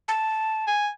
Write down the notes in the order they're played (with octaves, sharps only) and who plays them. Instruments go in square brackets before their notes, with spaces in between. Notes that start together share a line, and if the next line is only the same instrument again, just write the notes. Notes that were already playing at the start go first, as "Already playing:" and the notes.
[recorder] A5
[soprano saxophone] G#5